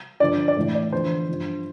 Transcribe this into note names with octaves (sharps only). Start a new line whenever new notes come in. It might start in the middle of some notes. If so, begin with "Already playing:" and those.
G2 D3 F3 D5
D5
A2 E3
D5
E2 D3 F3 C5
G2 F3